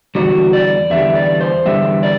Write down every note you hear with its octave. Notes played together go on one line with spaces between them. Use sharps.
E2 D3 G3 F#4
D5
E2 D3 G3 E5
D5
C5
E2 D3 G3 E5
D5